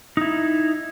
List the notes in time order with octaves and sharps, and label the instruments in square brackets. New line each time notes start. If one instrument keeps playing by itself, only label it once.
[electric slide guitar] D#4 E4